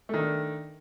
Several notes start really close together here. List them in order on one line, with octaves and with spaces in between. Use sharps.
A3 D#3 D4